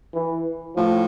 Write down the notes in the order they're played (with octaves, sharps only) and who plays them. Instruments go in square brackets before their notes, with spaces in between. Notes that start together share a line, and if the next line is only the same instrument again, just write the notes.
[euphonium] E3
[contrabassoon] A2 [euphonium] F3